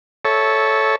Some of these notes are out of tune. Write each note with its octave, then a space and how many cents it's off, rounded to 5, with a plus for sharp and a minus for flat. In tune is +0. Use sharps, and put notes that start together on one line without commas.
A4 -10 C#5 +0 E5 -15